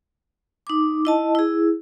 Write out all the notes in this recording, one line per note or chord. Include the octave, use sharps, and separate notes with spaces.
D#4 D6
E4 D#5 A5
E4 G#4